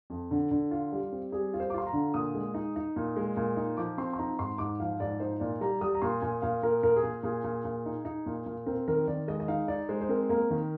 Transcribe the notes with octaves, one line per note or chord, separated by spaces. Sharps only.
F2
D3
D3
F4
G3
C4
G3 G#4
F4
C5
D6
F4 C6
A#5
D3
A#2 D#6
G#3
D#4
D#4
A#2
G#3
A#2
D#4
F3 D6
C4 C6
C6
D#4 A#5
G#2 C6
G#2 D6
F3 F5
G#2 D5
D#4 C5
A#2 D5
G3 A#5
G3 D#6
A#5
A#2 C6
A#2 G#5
A#2 F5
A#2 A#4
A#2 A#4
G#4
A#2
A#2 G#4
A#2
A#2
D#4
D#4
A#2
A#2
C4 A#4
D#3 A#4
D#3 D5
G#3 D#5
D#5
D#4 F5
D#4 D5
G#3 C5
C5
C4 A#4
A#3 A#4
D#3